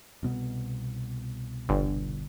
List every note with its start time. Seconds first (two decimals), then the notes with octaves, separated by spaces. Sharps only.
0.23 C2 B2 B3
1.69 G1